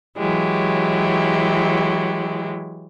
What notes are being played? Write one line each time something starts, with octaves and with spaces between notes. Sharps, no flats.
E3 F#3 G#3 G4